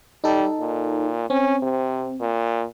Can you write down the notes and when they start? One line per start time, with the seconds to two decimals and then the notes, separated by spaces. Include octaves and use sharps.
0.24 G3 D#4 A4
0.60 A#2
1.30 C4 C#4
1.62 C3
2.20 A#2